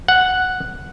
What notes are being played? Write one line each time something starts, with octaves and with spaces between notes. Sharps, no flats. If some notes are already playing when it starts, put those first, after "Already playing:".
F#5